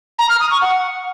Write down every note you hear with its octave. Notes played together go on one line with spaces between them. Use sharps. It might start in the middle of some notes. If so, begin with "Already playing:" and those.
A#5
F6
D#6
C#6
F#5